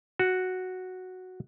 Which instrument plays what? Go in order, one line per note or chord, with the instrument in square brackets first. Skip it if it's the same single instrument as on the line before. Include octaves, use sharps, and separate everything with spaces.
[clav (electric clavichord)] F#4